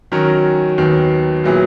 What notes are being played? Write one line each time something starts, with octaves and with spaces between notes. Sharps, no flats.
D#3 F#3 C#4 F#4 A#4
D#2 D#3 F#3 B3
A#2 F#3 B3 E4 G#4